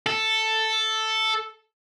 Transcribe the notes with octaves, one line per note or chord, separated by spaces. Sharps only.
A4